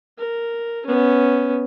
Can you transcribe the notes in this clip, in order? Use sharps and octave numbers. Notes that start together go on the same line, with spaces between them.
A#4
B3 C#4